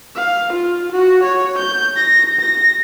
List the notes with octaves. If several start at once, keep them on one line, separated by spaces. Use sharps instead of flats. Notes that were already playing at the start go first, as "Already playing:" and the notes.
F5
F4
F#4
C#5
G6
A#6
A#6